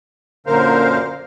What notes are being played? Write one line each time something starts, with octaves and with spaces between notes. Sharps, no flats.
F#2 A#2 D3 A#4 C5 F5